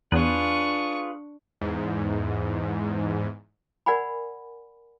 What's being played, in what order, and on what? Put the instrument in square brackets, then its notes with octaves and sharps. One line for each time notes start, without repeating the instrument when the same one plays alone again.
[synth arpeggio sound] E2 [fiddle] D4 C#6 [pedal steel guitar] F4 G#4 B4
[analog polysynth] E2 G#2
[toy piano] A#4 D5 F#5 G#5 B5